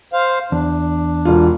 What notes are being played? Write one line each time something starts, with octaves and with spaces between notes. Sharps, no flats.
C5 F5
E2 D4
E1 F4